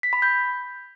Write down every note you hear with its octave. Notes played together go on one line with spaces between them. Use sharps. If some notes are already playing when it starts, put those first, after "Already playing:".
B6
B5
G6